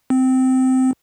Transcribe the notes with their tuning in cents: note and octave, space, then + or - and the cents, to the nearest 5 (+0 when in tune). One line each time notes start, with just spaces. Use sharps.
C4 -15